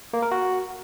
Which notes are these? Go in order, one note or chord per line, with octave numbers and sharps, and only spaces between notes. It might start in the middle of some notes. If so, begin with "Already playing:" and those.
A#3
A#4
F#4